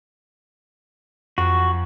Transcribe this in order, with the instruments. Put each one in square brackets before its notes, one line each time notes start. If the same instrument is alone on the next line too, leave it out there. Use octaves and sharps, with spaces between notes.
[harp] F2 [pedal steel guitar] F#4